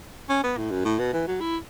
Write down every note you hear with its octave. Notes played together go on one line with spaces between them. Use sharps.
C#4
B3
A2
F#2
A2
B2
E3
F#3
E4